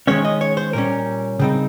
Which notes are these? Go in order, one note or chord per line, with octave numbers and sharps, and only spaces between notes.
D#3 G#3 C#4 C#5
D#5
C#5
C5
A#2 G3 C#4 A#4
C#3 G3 C4 D#4